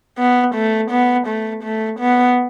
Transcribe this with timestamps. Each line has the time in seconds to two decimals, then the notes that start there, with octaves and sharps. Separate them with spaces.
0.19 B3
0.55 A3
0.91 B3
1.28 A3
1.64 A3
2.00 B3